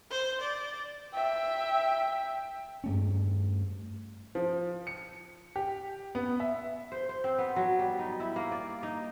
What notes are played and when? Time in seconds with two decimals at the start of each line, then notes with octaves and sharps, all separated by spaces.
0.10 C5
0.41 D5
1.14 E5 G5
2.84 G2 A3 C#4
4.35 F3
4.87 C#7
5.56 G4
6.15 B3
6.40 E5
6.92 C5
7.09 C5
7.24 C4
7.38 B3
7.56 F#3
7.79 G3
7.99 D#4
8.20 E4
8.36 A#3
8.51 D5
8.83 D#4